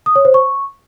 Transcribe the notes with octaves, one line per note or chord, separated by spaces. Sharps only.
D#6
C#5
C5
C#6